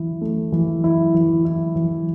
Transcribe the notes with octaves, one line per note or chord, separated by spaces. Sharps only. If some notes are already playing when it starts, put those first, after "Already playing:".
Already playing: E3 E4
A3
E3
E4
E3
E4
E3